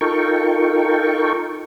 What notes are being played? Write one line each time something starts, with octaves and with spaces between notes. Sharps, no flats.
D#4 F4 A4 A#4 G5 C#6